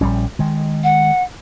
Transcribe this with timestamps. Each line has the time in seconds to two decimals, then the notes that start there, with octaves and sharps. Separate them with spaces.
0.01 A#1 G3 C#4
0.39 D#3 G#3
0.84 F#5